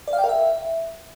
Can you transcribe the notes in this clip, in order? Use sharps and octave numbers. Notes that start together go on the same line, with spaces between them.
D5
F5
G5
A#4
E5